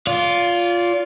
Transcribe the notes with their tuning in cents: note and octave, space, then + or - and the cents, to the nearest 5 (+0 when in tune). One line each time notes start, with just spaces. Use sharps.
F4 +0 D5 -35